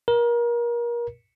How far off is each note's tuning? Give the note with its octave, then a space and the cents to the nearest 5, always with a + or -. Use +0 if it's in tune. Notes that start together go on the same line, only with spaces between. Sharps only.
A#4 +30